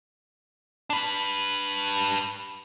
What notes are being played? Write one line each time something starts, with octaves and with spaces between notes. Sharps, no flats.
D4 B4